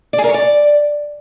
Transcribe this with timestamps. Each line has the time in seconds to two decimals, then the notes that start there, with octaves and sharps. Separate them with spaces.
0.13 D5
0.18 G#4
0.24 A#4
0.29 C#5
0.34 D5